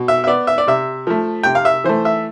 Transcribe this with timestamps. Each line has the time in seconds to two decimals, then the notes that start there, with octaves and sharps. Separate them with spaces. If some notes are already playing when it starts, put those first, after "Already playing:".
Already playing: B2
0.08 E5
0.24 E5
0.27 B3 D5
0.47 E5
0.58 D5
0.67 C3 E5
1.07 F3 A3
1.43 C3 G5
1.55 F5
1.65 E5
1.84 E3 A3 C5
2.05 E5